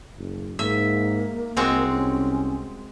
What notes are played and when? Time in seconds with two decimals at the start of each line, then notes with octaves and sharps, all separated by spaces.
0.18 F#1
0.59 G#2 A#3 E5
1.57 C2 G#3 C4 F#4
1.91 C#4